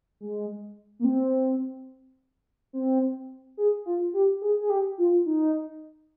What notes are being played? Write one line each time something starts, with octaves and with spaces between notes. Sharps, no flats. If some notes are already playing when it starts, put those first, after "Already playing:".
G#3
A#3
C4
C4
G#4
F4
G4
G#4
G#4
G4
F4
D#4